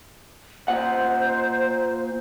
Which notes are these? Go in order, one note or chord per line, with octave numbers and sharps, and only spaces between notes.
A#2 C5 F#5